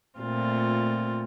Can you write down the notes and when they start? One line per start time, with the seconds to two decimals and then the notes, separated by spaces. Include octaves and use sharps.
0.20 A#2 A3 C4 F4